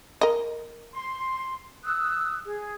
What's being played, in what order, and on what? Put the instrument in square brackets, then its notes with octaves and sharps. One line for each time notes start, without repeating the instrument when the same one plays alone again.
[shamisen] A#4 D#5
[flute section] C6
D#6 E6 F#6
G#4